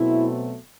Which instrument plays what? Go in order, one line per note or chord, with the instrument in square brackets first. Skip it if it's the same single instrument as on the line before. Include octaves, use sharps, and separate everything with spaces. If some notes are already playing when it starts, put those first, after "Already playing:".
Already playing: [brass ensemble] B2 F#3 A3 C4 E4